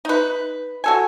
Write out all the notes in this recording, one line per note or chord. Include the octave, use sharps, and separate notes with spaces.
D#4 B4
F#4 A4 G#5